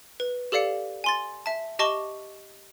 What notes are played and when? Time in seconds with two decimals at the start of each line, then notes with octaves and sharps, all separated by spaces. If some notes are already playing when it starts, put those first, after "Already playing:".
0.20 B4
0.52 G4 A4 D5 F5 C#7
1.04 G#5 C6 A6
1.46 E5 A5
1.79 G4 D#5 A5 C#6 D6 G7